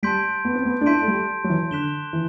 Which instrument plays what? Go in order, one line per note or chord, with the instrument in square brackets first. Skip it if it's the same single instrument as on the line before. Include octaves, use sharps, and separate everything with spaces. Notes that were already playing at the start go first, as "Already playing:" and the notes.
[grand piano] G3 [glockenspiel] A5 C6 G6 B6 D7
[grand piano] B3
C4
B3
D4
[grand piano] E4 [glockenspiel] A5 C6 G6 B6 D7
[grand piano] A3
G3
F#3
E3
[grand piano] D3 [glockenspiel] C6 F#6 B6 E7 G7
[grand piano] E3